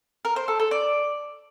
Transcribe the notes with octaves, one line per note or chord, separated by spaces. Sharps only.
A#4
C5
A4
A4
D5